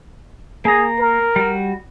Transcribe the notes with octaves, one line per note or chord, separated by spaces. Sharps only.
A#3 G#4 A#5
A#4
G3 F#4